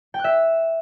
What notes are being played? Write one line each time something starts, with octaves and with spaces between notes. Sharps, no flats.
G5
F#6
E5